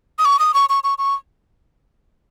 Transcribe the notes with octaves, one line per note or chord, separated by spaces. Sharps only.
D#6
C#6
D#6
C#6
C#6
C#6
C#6